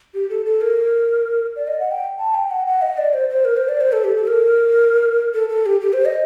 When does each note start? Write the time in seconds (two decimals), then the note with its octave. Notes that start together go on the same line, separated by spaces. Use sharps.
0.14 G4
0.30 A4
0.45 A4
0.61 A#4
1.56 D5
1.67 D#5
1.80 F#5
1.91 G5
2.19 A5
2.35 G5
2.51 F#5
2.66 F#5
2.82 D#5
2.98 D5
3.14 C5
3.29 C5
3.45 A#4
3.57 C5
3.69 D5
3.81 C5
3.93 A4
4.04 G4
4.16 A4
4.27 A#4
5.34 A4
5.49 A4
5.66 G4
5.81 G4
5.93 C5
6.05 D#5